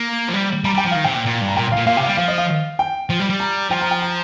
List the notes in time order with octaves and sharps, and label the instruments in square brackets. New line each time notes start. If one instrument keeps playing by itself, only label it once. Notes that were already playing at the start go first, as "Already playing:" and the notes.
Already playing: [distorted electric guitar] A#3
F3
G3
[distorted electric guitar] G3 [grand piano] A#5
[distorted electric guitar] G3 [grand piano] G5
[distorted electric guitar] F3
[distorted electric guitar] D#3 [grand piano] F5
[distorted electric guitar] C3 [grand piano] G5
[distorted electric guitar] A#2
A#2
G2
[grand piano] A#5
[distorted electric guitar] A#2 [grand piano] G5
[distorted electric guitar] A#2 [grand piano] F5
[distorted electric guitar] A#2 [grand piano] F5
[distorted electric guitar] C3 [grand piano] G5
[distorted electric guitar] G3 [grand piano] F5
[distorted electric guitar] F3 [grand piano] F5
[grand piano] D#5
F5
G5
[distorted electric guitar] F3
G3
G3
[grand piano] A#5
[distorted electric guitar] F3 [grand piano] G5
[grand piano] A#5
G5
A#5